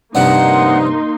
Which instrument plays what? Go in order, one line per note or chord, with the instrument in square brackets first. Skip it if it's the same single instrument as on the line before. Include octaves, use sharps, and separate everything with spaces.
[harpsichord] G2 C3 F3 [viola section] A#3 D#4 C6 [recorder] F#5